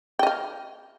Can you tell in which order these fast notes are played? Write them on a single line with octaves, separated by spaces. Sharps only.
G5 D#5 F5